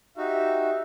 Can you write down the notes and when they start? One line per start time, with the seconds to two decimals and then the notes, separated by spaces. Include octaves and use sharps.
0.17 D#4 F#4 G4 E5